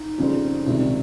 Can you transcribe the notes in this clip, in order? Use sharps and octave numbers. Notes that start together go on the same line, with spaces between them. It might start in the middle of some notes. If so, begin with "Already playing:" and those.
Already playing: D#4
F2 C#3 G3 C4
C#2 C3 D#3 G3 C4